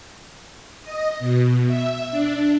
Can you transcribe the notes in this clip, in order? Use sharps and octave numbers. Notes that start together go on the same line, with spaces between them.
D#5
B2
E5
D4